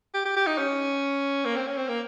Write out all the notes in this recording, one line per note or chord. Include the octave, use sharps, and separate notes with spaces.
G4
G4
G4
D#4
C#4
A#3
C4
C#4
C4
A#3